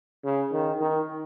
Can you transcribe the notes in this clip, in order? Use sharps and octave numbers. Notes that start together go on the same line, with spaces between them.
C#3
D#3
D#3